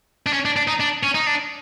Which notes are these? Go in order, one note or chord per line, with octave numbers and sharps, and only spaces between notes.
D4
C#4
D4
D4
D#4
D4
C#4
D#4
D4